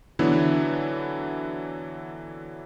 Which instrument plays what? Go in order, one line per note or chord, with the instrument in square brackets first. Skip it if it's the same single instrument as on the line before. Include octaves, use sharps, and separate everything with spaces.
[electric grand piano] D3 E3 F#3 B3 D4 E4